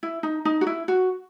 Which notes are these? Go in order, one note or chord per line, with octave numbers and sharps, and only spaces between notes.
E4
D#4
D#4
F#4
E4
F#4